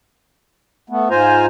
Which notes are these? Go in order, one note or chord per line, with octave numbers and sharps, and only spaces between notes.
A3 B3
G#2 F4 C5 G#5 A#5